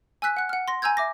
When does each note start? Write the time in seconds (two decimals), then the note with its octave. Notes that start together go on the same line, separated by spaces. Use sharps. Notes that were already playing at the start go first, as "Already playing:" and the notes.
0.22 G#5 E6 F#6 B6
0.37 F#5 F#6
0.49 F#5 F6
0.68 C6 A#6
0.82 G#5 A#5 E6 G6 G#6
0.97 E5 D6 A#6